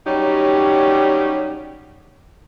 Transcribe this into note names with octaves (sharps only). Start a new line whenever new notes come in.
F#3 G3 C#4 D#4 G4